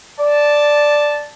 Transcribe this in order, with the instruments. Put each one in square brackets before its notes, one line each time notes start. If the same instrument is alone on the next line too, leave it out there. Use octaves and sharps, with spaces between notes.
[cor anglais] D5 [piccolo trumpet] A5